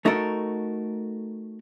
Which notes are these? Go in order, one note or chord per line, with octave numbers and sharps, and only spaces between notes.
A3 D#4 F#4 A4 A#4